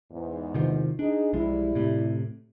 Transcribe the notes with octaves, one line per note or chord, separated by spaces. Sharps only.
E2 G#2
C3 D#3 F3
D4 D#4 G#4
B1 F3 G3 G#3 E4
A2 C3